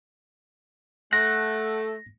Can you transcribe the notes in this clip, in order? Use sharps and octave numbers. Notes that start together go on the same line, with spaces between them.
A3 F#5 A#6